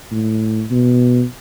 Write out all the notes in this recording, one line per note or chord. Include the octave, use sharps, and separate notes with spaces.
A2
B2